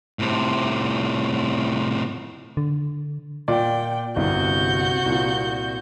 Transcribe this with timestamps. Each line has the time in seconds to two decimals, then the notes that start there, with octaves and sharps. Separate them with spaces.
0.19 A2 C3
2.57 D3
3.48 A#2 D5 G5
4.16 G1 C2 C3 F#4 G6
5.06 C2 A#2